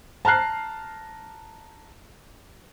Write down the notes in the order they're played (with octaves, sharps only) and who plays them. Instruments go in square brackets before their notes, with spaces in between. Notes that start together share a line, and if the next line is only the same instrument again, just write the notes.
[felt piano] A5 A#5 F6 F#6 C7